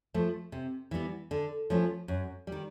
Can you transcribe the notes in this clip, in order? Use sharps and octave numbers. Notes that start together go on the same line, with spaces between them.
F3 A3
C3
E3 G3 B3
D3
F3 A3 C#4
F#2
D#3 G3